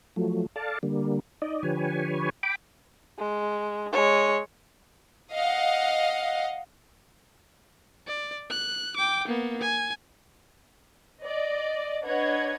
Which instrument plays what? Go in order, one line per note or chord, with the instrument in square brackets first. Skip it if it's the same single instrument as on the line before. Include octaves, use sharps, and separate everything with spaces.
[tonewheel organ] F3 F#3 A3
A4 D5 F5 A5
D3 G3 A#3
D#4 D5 D#5
D3 F3 G4 B4 C#5 G#5
G5 B5 D6
[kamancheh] G#3
G#3 C#5
[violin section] D#5 F5 F#5
[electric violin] D5
F#6
G5 D6
A#3 B3
G#5
[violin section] D5 D#5
D4 B4 C#5 D#5 F#5 G#6